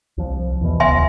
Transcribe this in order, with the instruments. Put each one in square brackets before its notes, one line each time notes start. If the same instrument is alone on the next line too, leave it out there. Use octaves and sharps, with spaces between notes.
[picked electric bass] C2 F3
E2 B2
[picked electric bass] D#1 C#2 [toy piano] E5 G#5 C6